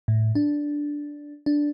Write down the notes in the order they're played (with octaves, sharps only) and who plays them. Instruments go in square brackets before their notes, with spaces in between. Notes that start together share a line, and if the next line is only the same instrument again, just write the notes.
[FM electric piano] A2
D4
D4